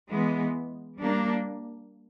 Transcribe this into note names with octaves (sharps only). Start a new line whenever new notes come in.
E3 G#3 B3
G3 A#3 D4